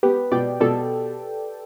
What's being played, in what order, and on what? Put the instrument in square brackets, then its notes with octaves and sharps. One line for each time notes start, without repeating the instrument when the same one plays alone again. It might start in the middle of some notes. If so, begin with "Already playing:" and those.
[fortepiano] B3 [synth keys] G4 B4
[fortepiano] B2 [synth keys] D5 G5
[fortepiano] B2 [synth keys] A4 D5